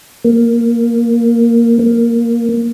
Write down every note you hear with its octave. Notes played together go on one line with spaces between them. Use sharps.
A#3
A#3